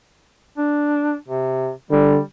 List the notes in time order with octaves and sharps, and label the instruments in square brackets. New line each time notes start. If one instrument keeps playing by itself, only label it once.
[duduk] D4
C3
[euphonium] D3 [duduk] G3